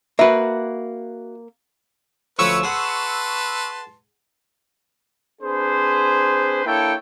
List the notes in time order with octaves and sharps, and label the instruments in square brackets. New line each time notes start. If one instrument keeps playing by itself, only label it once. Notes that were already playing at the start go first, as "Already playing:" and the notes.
[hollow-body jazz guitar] A#3 B4 [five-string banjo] F#4 E5
[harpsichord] D2 F3 C#4 [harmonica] B4 C#5 [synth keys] C#6 E6
[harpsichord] G#4 F#5 [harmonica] B4 A5 C6
[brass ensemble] C4 D4 G#4 B4 C5
A#3 D4 E4 A4 C#5 G5